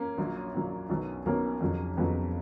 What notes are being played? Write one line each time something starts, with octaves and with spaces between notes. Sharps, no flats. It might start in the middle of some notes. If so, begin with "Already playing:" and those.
Already playing: A#3 C#4
A#1 A#2 F#3
A#1 A#2 F#3
B1 B2 F#3
B1 B2 F#3 A#3 C#4
F2 C#3 F#3
F2 C#3 F#3 B3